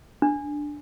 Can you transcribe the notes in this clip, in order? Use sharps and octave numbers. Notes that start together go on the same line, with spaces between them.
D4